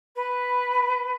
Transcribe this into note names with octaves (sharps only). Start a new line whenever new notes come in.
B4